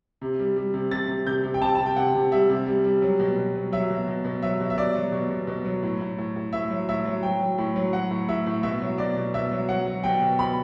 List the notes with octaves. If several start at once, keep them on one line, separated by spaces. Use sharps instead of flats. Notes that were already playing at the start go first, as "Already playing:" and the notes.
C3
G3
G3
C3
C3 A6
C3
C3 G6
C3
G5
C3 A5
C3 A5
G5
C3 F#5
C3
G3 E5
C3
G3
G3
F#3
B2
B2
F#3
F#3 E5
B2
B2
B2
F#3 E5
B2
E5
B2 D5
F#3
B2
B2
B2
F#3
A2
A2
A2
A2
A2 E5
F#3
A2 E5
F#3
F#3 G5
F#3
A2
F#3
F#3 F#5
A2
A2 E5
A2
B2 E5
F#3
B2 D5
B2
B2 E5
F#3
F#3 F#5
F#3
B2 G5
B2
B2 B5